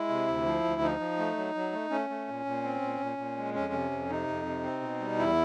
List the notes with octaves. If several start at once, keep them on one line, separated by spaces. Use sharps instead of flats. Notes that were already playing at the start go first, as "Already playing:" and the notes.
Already playing: G#3 E4
C3
D2
F3
D2
F3 D#4
F3
A3
F#3
F#3
A3
A3 C#4
A3
A#2
A#2
C4
A#2
A#2
A#2
G#3
F2 C#4
C3
F2
C3 D#4
F2
C3
C4
B2
G3
E2 E4